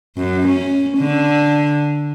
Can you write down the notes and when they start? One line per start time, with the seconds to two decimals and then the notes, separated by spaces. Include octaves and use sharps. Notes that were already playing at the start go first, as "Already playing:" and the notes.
0.17 F#2
0.48 C#4
0.98 D3